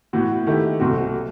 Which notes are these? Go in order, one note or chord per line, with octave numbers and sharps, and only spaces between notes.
A2 E3 B3 F#4
D#3 A3 E4 G4
C2 B2 A3 C4 F#4
F#3